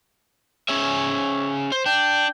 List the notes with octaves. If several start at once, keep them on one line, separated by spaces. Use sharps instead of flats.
C#4 G#4 C#5 E5
C5
D4 G5